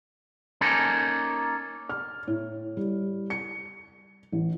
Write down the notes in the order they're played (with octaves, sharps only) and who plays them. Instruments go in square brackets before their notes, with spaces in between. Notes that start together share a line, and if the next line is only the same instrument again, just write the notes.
[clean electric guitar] A#3 C#4 D#4 A4
[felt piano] F6
A2
G3
C#7
A1